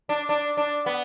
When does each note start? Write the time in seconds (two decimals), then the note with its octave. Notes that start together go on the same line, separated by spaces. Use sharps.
0.09 D4
0.29 D4
0.57 D4
0.86 B3